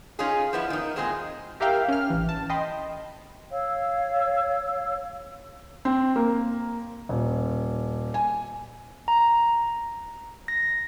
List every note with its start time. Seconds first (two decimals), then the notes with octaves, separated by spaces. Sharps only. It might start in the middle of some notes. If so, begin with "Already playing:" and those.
0.19 C#4 D#4 F4 G#4
0.53 F3 B3 E4
0.70 D#3 D#4
0.96 A#2 G#3 C4 D4 G#4
1.60 E4 G4 A#4 E5 F5 G5
1.88 C#4 F6
2.10 A1 E3
2.29 A5
2.49 D#5 G5 B5 C6
3.51 C#5 F5 E6
5.85 C4
6.16 A#3
7.09 D#1
8.14 G#5
9.08 A#5
10.48 A#6